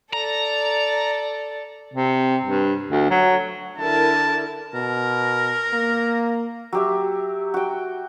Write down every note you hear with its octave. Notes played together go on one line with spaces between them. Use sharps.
A4 D5 A#5
C3
G2
D2
F#3
D3 E4 A#4 A5
B2 A#4
A#3
F#3 G4 E5
F#4 G5